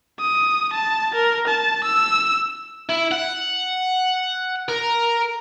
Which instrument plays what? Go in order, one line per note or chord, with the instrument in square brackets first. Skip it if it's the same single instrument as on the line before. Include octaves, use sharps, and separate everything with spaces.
[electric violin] D#6
A5
A#4
A5
E6
[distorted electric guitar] E4
F#5
A#4